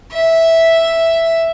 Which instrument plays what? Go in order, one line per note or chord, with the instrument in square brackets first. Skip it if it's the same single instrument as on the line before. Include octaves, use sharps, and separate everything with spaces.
[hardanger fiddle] E5